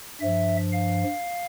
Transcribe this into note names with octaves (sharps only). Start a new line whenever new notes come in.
G2 F3 E5
F5